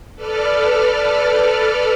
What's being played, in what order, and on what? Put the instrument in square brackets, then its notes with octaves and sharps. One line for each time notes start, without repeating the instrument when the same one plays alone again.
[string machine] A4 B4 D5 F6